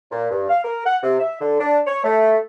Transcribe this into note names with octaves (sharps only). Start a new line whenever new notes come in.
A#2
G2
F5
A#4
F#5
C3
E5
D3
D4
C#5
A3